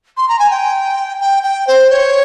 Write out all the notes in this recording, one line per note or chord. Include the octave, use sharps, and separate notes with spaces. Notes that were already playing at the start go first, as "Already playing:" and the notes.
C6
A#5
G#5
G5
G5
G5
C5
C#5